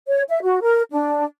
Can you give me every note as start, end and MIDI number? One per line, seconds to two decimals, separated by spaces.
0.07 0.22 73
0.29 0.38 76
0.43 0.60 66
0.61 0.81 70
0.91 1.25 62